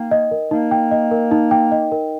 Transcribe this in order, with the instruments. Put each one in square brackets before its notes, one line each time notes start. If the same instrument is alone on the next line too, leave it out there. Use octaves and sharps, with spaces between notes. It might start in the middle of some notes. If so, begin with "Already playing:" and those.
Already playing: [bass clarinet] A#3 [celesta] D#4 G5
[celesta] D#5
A#4
[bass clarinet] A#3 [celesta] D#4
[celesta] G5
D#5
A#4
D#4
G5
D#5
A#4